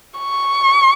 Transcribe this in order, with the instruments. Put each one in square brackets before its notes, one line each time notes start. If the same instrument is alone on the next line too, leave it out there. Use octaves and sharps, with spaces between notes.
[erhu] C#6